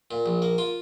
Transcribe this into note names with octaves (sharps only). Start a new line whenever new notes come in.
A#2
A#1
A#3
F4